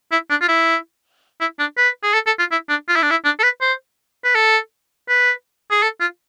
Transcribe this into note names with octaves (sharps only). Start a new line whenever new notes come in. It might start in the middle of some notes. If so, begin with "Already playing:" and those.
E4
D4
F4
E4
E4
D4
B4
G#4
A4
A4
F4
E4
D4
F4
E4
D4
E4
D4
A4
B4
C5
B4
A4
B4
G#4
A4
F4